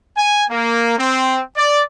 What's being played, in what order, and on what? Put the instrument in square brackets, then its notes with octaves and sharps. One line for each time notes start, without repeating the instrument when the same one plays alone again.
[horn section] G#5
A#3
C4
D5